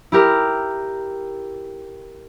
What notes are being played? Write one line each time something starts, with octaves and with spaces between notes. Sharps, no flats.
E4 G4 A#4